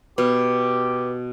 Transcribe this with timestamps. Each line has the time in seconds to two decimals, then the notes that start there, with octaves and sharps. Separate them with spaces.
0.18 B2 G4 B4